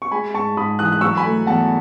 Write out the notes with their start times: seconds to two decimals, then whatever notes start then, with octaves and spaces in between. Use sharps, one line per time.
0.02 C#6
0.11 G#3 G#5 B5
0.34 G#2 A5 C#6
0.57 G#2 B5 D#6
0.79 E3 D#6 F#6
0.92 F#6
1.01 F#3 C#6 E6
1.17 G#5 B5
1.24 A3
1.47 E2 F#5 A5